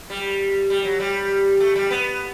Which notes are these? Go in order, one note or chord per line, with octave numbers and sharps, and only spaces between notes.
G3
G3
F#3
G3
A3
G3
B3